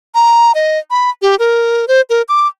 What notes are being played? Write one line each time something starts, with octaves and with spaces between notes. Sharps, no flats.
A#5
D#5
B5
G4
A#4
C5
A#4
D6